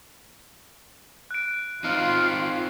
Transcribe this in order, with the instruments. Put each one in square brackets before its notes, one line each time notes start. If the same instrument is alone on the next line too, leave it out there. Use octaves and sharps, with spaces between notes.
[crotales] F#6 D7
[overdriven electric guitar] C4 D#4 [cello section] F4 [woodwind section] F6